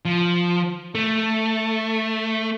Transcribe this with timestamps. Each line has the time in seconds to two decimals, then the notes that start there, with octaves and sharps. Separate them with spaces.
0.05 F3
0.95 A3